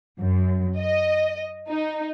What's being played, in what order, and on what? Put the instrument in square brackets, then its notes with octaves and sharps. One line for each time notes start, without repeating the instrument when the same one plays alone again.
[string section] F#2
D#5
D#4